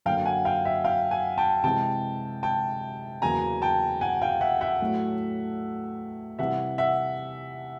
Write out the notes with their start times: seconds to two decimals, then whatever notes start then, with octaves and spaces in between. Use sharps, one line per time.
0.06 F#2 D3 F#3 A#3 F5 G5
0.25 F#5 G#5
0.45 F5 G5
0.65 E5 F#5
0.84 F5 G5
1.11 F#5 G#5
1.38 G5 A5
1.64 C3 E3 G#3 G5 A5
2.43 G5 A5
3.22 E2 C#3 F#3 A#3 G#5 A#5
3.62 G5 A5
4.01 F#5 G#5
4.22 F5 G5
4.41 E5 F#5
4.61 E5 F#5
4.81 A2 F#3 A3
6.39 C3 E3 G3 E5 F#5
6.78 E5 F#5